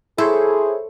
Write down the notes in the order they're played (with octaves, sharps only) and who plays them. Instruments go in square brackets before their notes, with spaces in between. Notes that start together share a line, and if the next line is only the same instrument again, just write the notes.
[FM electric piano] E4 C5 C#5 [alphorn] G#4 [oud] A4